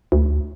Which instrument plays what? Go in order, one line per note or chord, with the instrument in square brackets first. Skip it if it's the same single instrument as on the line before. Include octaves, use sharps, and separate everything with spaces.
[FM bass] D2